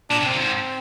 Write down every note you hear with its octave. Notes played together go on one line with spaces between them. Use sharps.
A#2 D4
C3
C4
A#2
G#2